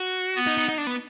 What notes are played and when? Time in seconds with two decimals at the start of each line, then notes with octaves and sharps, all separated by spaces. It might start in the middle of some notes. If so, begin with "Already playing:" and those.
Already playing: F#4
0.36 B3
0.47 D#4
0.58 D#4
0.69 D#4
0.78 D4
0.87 B3